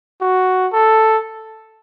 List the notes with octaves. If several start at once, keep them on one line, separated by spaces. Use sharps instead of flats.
F#4
A4